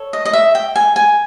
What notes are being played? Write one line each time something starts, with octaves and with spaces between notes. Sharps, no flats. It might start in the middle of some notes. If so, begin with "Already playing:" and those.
Already playing: A4 C#5
D#5
D#5
E5
G5
G#5
G#5